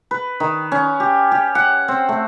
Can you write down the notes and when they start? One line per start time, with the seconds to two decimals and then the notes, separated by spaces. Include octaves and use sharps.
0.11 B4
0.40 D#3
0.72 C#4
1.00 G4
1.32 G4
1.55 F#5
1.88 C4
2.09 A3